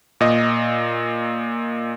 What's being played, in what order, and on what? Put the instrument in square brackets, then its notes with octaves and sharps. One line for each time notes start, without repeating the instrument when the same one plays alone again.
[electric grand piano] A#2 D#5